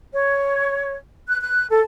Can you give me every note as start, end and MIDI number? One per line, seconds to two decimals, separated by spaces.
0.12 0.94 73
1.27 1.40 90
1.41 1.66 90
1.69 1.80 69